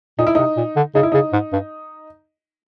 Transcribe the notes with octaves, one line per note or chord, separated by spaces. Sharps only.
A#2 D#4
E4
C3 D#4
A#2
D3
C#3 D#4
E4
C#3 D#4
G#2
G2